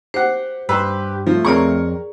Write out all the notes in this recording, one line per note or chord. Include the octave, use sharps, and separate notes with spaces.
G4 C5 F#5
G2 G4 A4 B4 C5 B5 E6
F3 A3
F2 C4 G#4 A#4 C#5 D5 A#5 C#6